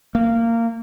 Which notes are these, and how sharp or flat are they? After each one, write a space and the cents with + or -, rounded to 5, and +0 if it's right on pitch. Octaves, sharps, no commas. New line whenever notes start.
A#3 -20